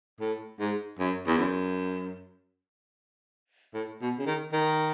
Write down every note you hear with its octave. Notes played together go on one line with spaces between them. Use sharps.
A2
G#2
F#2
E2
F#2
A2
B2
C#3
D#3
D#3